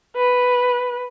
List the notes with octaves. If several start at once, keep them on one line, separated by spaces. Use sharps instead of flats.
B4